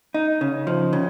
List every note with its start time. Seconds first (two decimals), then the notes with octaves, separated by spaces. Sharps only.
0.14 D#4
0.41 C#3
0.67 F3
0.93 C#3